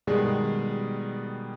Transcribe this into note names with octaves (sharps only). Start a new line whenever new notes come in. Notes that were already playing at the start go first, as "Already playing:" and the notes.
B2 D#3 G3 G#3 G#4